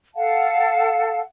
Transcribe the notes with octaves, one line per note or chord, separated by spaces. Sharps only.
A4 F5 F#5 A5